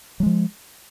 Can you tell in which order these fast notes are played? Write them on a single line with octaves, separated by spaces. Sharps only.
F#3 G#3 F3